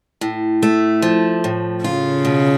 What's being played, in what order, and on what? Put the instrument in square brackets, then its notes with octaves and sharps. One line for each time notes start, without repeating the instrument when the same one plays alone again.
[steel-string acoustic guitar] A2
A3
F3
A2
[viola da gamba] C#3 [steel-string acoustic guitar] F4
[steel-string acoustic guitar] B2